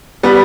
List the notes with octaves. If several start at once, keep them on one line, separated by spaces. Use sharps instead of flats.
G3 B3